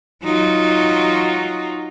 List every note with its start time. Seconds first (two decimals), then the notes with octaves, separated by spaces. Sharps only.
0.24 F#3 D#4 F4